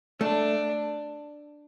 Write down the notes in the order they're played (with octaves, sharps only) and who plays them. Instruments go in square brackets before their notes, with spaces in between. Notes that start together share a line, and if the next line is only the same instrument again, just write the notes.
[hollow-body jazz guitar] A3 [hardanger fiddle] D4